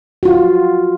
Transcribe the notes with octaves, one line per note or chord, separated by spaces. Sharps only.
F4 F#4